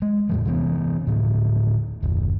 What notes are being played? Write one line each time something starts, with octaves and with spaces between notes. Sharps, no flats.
G#3
E2 A2 F3
C3 E3 B3
A2 D3 F3
F#1 D#2